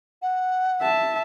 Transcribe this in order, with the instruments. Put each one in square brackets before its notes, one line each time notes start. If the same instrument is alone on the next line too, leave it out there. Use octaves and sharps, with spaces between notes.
[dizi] F#5
[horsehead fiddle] E5 A5